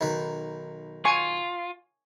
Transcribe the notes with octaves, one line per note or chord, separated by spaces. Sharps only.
B1 D#3 B4
F4 G#5 C#6